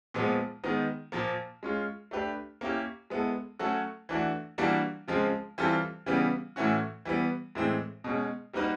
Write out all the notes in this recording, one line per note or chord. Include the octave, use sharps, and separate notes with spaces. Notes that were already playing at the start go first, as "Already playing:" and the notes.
A#2 F3 G#3 B3
D#3 G#3 B3 D#4
A#2 F3 A#3
G#3 C#4 F4
A3 D4 G4 B4
A#3 C#4 E4 G4
G#3 B3 E4 A4
F#3 A3 C#4 F#4 A4
E3 A3 D4 F#4
E3 G3 A#3 D4 F#4
C#3 F3 G#3 C4
E3 G3 C4 F4 A4
C#3 E3 G3 B3
A2 E3 A3 C#4 F#4
E3 G3 B3
A2 E3 G#3 C4
B2 G#3 C#4
G3 A#3 D#4 F#4 B4